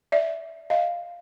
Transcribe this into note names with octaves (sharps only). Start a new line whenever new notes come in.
D5 E5
D#5 F5